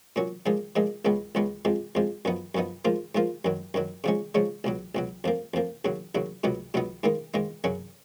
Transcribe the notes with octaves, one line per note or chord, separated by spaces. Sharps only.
A#2 F#3 C#4
A#2 F3 G#3 D#4
A#2 F3 G#3 D#4
C#2 C#3 G#3 B3
C#2 C#3 G#3 B3
F2 F3 G#3
F2 F3 G#3
F#2 F3 B3 D#4
F#2 F3 B3 D#4
G#2 F3 A#3 F4
G#2 F3 A#3 F4
F#2 D#3 F#3
F#2 D#3 F#3
C#3 F3 G#3 C#4
C#3 F3 G#3 C#4
C#2 B2 F#3
C#2 B2 F#3
F2 F3 A#3
F2 F3 A#3
D#2 C#3 F#3
D#2 C#3 F#3
C#2 B2 F#3 B3 D#4
C#2 B2 F#3 B3 D#4
G#2 D#3 A#3 D#4
G#2 D#3 A#3 D#4
F#2 C#3 F#3 C#4